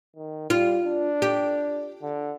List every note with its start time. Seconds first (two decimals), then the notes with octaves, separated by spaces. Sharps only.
0.16 D#3
0.50 G3 F4
0.85 D4
1.22 G4
2.02 D3